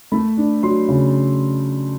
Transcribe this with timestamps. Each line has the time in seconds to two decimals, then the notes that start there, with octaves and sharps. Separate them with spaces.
0.12 A3 B5
0.37 D4
0.63 F#3 C6
0.88 C#3